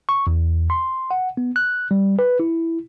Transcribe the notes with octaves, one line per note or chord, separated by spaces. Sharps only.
C#6
E2
C6
F#5
B3
F#6
G3
B4
E4